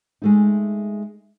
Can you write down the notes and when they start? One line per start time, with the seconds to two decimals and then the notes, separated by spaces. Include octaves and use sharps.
0.22 G#3 A3 D#4